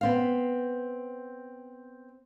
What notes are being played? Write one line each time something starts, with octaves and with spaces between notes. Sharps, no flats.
B3 C4 F5